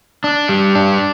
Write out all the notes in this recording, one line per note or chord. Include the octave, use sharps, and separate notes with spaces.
D4
G3
D4